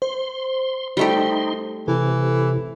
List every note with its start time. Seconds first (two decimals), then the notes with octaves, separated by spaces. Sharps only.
0.02 C5 C6
0.97 G3 A3 D#4 G4 C6
1.88 C3 E3 A4